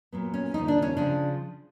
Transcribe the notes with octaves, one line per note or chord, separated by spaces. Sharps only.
A#2 F#3 B3
C#4
D#2 C#3 F3 D#4
D4
C#4
C#3 F3 D4